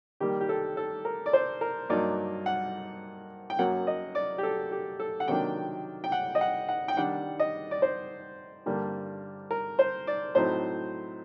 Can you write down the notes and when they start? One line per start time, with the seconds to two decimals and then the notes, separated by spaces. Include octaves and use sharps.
0.20 D#3 G3 A#3 G4
0.41 G4
0.49 A4
0.77 A4
1.05 A#4
1.26 D5
1.33 C5
1.61 A#4
1.90 G2 F#3 A#3 D#4 D5
2.46 F#5
3.50 G5
3.59 F#2 F#3 A#3 F#5
3.87 D#5
4.15 D5
4.38 G4
4.43 A4
4.72 G4
5.00 A4
5.20 F#5
5.28 C3 D#3 F#3 A#3 D4 G5
6.04 G5
6.12 F#5
6.35 D#5
6.41 F#5
6.68 F#5
6.88 G5
6.97 D#3 G3 D4 F#5
7.40 D#5
7.71 D5
7.82 C5
8.66 G2 D3 G3 A#3
9.51 A#4
9.79 C5
10.07 D5
10.35 A2 F#3 C4 D#4 C5